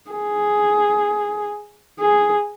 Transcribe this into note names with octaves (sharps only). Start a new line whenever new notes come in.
G#4
G#4